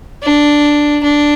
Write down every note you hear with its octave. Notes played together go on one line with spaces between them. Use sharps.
D4
D4